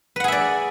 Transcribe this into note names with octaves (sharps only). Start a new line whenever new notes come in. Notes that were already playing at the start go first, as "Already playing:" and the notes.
G#4 B4 D5 E5 F#5